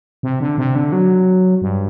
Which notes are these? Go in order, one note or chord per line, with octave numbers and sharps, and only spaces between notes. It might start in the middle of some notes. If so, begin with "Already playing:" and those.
C3
D3
C3
D3
F#3
G2